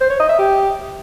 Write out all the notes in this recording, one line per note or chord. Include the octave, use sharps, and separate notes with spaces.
C5
C#5
D#5
E5
G4